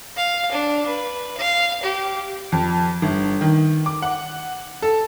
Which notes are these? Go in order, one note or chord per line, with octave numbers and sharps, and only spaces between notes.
F5
D4
B4
F5
G4
F2
G1
D#3
D6
F#5
A4